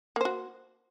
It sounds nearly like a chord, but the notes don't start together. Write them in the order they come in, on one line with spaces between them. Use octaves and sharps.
A#3 C5 F#4